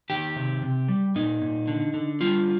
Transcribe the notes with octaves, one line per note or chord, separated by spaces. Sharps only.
D#3 G4
C3
C3
G3
A#2 D#4
A#2
D3
D3
G3 F4